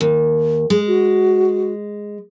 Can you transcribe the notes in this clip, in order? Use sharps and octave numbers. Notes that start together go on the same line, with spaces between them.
D#2
G#3 G#4
F#4